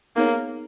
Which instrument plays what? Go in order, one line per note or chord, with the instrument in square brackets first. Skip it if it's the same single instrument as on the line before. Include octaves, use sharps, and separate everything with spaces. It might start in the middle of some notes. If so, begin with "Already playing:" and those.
[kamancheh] A#3 [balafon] B3 D#4 G#4 C#5